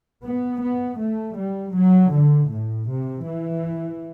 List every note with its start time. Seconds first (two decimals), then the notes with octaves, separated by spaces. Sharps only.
0.22 B3
0.60 B3
0.98 A3
1.36 G3
1.73 F#3
2.11 D3
2.49 A2
2.88 C3
3.25 E3